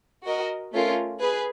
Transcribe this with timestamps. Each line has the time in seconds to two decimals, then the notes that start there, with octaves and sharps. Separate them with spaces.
0.24 F#4 A#4 D#5
0.73 A3 C#4 F4 A#4
1.20 G#4 B4